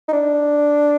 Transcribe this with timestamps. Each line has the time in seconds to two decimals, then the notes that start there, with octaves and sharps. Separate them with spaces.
0.08 D#4
0.13 D4